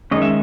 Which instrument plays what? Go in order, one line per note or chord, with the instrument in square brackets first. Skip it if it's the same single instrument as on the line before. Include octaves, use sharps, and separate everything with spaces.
[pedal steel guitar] D#3 G#3 C#4 D#5
E5